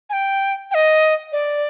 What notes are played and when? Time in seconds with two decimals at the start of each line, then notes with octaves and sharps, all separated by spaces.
0.10 G#5
0.13 G5
0.71 G5
0.75 D#5
1.32 D5